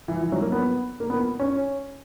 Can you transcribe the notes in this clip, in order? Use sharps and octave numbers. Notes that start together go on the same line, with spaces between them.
E3
E3
F#3
A#3
B3
A#3
B3
C#4